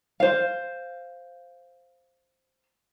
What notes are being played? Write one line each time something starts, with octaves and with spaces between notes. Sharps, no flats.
C5 F5